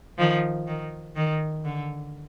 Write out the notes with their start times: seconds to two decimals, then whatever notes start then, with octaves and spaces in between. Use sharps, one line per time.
0.18 D#3 F3
0.67 D#3
1.16 D#3
1.65 D3